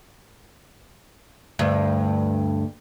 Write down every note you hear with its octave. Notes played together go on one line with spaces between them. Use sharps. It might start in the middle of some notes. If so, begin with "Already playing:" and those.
D2 G2